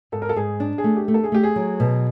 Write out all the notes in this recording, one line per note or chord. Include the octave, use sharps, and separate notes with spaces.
G#2 A4
A#4
A4
G#2 G#4
D4
G#4
A3
G4
A3
A4
G#4
A3 G4
G#4
F#3
B2